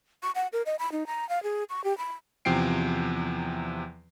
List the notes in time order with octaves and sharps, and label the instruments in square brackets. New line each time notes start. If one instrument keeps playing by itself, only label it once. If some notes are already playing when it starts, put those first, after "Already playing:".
[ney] C#6
F#5
A#4
D#5
B5
D#4
A#5
F5
G#4
C#6
G4
B5
[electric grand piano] E2 C3 F3 G5 C7 D7